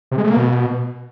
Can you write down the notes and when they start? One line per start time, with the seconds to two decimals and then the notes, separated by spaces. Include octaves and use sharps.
0.11 C3
0.18 G#3
0.24 A3
0.30 A#3
0.37 B2